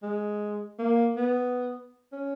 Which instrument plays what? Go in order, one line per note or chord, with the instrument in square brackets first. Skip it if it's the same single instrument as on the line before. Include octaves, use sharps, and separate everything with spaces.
[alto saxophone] G#3
A#3
B3
C#4